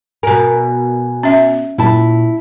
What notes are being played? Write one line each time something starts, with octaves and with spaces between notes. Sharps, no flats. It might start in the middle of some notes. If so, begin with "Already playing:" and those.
B2 A#4 G#5
C#4 E5
A#2 E4 A5